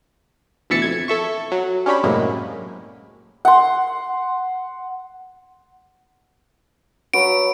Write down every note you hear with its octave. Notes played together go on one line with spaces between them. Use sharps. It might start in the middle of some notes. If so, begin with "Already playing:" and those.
D2 B2 E3 E5 A6 C#7
F2 G#6
A4 E5 C#6
F#3
C#4 D4 G4 C#5 B5
F#2 A2 C3 F#3 G#3 A#3
F#5 C6
F#3 B4 D7